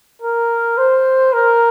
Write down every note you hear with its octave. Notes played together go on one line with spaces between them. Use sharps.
A#4
C5
A#4